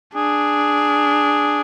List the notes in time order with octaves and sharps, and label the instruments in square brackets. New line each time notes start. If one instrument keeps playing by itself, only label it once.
[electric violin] D4 [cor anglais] G#4